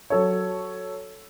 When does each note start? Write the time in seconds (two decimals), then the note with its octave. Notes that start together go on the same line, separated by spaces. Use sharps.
0.10 F#3 A4 C#5